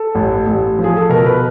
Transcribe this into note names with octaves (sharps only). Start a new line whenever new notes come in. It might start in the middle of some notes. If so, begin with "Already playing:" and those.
Already playing: A4
A1
A1
F3
G#4
A4
B2 A#4
B4